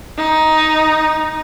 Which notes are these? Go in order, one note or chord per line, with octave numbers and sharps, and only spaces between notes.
D#4